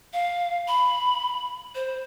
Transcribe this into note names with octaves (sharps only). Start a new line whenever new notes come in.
F5
B5
C5